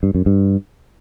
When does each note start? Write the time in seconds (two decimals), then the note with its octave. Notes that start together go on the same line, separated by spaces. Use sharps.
0.03 G2
0.15 F#2
0.26 G2